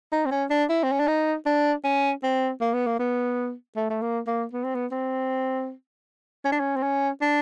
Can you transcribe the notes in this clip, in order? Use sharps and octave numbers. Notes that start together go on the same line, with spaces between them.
D#4
C4
C#4
D4
E4
C4
C#4
D4
D#4
D4
C#4
C4
A#3
B3
A#3
B3
A3
A3
A#3
A#3
B3
C4
B3
C4
C#4
D4
C#4
C4
C#4
D4